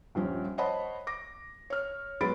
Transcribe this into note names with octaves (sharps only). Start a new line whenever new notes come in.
D#1 G2 F3 C#4
C5 C#5 D#5 F#5 A5 B5
D6 A#6
C#5 F6
F#3 G#3 B3 B5 A6 D7